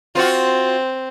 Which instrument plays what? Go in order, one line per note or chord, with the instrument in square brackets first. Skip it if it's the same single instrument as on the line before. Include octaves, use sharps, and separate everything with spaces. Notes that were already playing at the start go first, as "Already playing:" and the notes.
[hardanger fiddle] C4 [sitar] F4 F#4